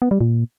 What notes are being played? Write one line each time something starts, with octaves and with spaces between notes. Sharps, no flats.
B3
G3
A#2